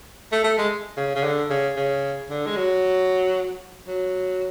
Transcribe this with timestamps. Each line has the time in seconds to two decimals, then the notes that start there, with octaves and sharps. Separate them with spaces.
0.32 A3
0.44 A3
0.58 G#3
0.97 C#3
1.15 C#3
1.24 D3
1.50 C#3
1.76 C#3
2.30 D3
2.47 G#3
2.57 F#3
3.88 F#3